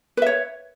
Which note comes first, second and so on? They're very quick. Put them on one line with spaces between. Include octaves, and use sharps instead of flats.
B4 E5 C#5